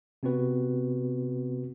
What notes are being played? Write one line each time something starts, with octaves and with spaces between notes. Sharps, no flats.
C3 B3 C4 F#4 B4